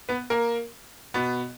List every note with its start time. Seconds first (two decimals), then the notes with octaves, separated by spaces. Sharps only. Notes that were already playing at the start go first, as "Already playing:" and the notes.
0.09 B3 B4
0.30 A#3 A#4
1.14 B2 B3